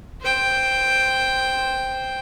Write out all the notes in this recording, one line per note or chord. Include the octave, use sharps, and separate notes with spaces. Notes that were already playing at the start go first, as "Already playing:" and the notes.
C5 G5